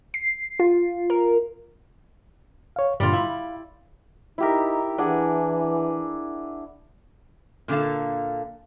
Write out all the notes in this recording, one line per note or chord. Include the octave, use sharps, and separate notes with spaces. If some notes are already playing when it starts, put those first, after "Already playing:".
C7
F4
A#4
C#5 F5
G2 A#2 D3 G3 F4
E4 F5
D#4 E4 G4 A#4
E3 D4 G#4 F#5
A#2 D3 A#3 A4 F5